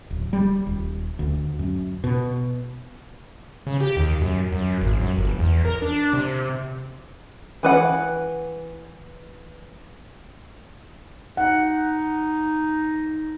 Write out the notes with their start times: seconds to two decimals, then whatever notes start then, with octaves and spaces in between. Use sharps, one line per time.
0.10 D1
0.33 G3
0.67 D#1
1.19 D2
1.59 F#2
2.04 B2
3.67 C#3
3.80 G4
3.97 D#2
4.21 F#2
4.53 F#2
4.81 G#1
5.00 F#2
5.18 G1
5.39 E2
5.65 A#4
5.82 D4
6.13 C3
7.63 E3 B4 F#5
11.37 D#4 F#5